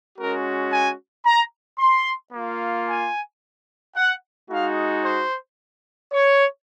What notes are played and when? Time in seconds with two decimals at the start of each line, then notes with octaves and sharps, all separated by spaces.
0.17 G#3 C#4 F#4 A#4
0.71 G#5
1.24 A#5
1.78 C6
2.32 A#3 F4
2.87 G#5
3.95 F#5
4.48 G#3 D#4 F#4 F5
5.03 C5
6.12 C#5